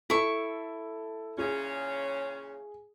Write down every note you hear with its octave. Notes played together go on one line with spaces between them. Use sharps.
E4 A4 C#6
A#2 C#3 C#4 G#4